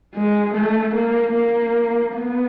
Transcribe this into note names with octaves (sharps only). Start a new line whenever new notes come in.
G#3
A3
A#3
A#3
B3